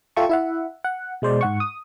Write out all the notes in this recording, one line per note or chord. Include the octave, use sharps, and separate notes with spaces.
F4 A4 E5 G5 A5 C#6
E4 E5 F#5
F#5
B2 G#3 C5 D5
G#2 F#5 C#6
D#6